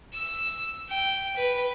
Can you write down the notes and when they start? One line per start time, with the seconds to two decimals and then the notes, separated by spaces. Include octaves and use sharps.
0.13 E6
0.89 G5
1.36 B4